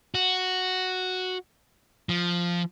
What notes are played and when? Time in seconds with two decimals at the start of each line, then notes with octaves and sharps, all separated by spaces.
0.15 F#4
2.09 F3